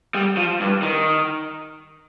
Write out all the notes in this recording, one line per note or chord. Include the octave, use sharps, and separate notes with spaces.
G3
F3
G2
D#3